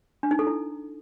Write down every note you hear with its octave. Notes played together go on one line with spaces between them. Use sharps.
D4
D#4
A4
E4